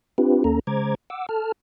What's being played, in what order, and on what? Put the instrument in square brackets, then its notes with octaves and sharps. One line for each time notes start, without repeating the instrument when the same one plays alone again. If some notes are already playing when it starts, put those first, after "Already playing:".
[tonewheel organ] C4 D4 F4 G4 B4
D#2 A#3 C#4 A4 A#5
C#3 G#3 C5 A#5 D6 G#6
F#5 D6 E6
A4 A5 F6